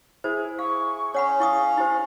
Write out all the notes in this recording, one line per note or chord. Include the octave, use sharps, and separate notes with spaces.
E4 G#4 C5
F5 C#6
C#4 C#5 F#5 B5
E4 F5 C#6 D#6
E4 G4 C5